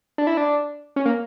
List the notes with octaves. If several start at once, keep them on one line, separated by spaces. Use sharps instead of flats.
D4
E4
D4
C#4
A#3